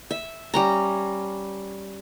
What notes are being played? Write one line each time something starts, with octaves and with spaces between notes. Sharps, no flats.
E5
G3 C#4 A#5